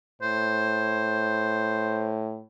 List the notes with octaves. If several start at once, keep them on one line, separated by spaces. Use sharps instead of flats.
A2 C5